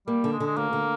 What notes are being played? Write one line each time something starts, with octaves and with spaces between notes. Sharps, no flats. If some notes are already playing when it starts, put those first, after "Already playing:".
G3 A#3
D3
G#3
D3
G#3
D2 A#3
D3